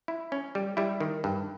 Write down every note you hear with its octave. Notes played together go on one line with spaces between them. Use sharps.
E4
C#4
G3
G3 E4
D#3
G2